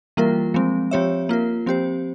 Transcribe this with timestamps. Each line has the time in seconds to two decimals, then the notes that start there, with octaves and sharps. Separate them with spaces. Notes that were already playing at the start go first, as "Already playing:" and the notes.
0.17 E3 G3 A#3 F4 A#4
0.54 F3 G#3 C4
0.91 F3 C4 G4 C#5 E5
1.29 A#3 F4 A#4
1.66 F3 C4 G4 C5